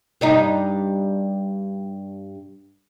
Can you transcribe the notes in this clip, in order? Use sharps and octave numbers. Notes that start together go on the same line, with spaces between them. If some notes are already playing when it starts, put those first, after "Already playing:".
G2 G3 D#4